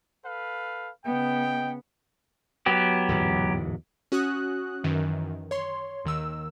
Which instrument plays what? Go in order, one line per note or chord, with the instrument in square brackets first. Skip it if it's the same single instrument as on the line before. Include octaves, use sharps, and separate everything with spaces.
[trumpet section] A4 B4 F5
[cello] C#3 B3 [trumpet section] D#5 G5
[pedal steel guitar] F#3 B3 G4
[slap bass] D1 E2 G#2
[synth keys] C#4 F#4 D#6 F#6
F#2 D#3 E3
C#5 C6
D#2 D#3 E6